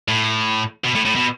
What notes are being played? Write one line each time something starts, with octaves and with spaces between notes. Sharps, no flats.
A2
B2
A2
A2
B2